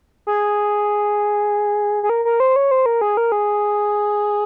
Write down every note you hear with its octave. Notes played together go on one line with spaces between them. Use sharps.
G#4
G#4
A#4
A#4
C5
C#5
C5
A#4
G#4
A#4
G#4